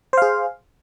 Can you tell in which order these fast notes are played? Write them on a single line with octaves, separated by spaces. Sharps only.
C5 F5 G#4